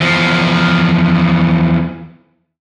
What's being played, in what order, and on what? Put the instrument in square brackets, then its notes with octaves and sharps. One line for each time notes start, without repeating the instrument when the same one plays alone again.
[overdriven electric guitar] E2 F3